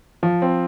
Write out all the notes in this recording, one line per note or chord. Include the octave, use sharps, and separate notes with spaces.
F3
C4